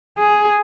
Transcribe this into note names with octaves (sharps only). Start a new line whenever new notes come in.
G#4